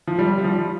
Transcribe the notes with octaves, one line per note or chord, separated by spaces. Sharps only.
F3
G3
G3
F3